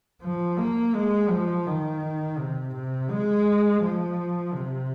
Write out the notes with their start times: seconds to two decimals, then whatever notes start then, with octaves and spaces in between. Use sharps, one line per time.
0.22 F3
0.58 A#3
0.94 G#3
1.30 F3
1.66 D#3
2.38 C3
2.74 C3
3.10 G#3
3.82 F3
4.54 C3